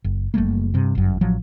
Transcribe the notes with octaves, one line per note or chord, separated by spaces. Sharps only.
F#1
F#1 G3 A3 A#3
G2 C3
G1 F#2
A1 F3 F#3